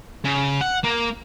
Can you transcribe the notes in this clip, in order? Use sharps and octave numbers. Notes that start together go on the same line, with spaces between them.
C#3
F#5
A#3